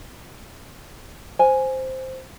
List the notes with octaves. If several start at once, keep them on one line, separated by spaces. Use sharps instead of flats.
C5 G#5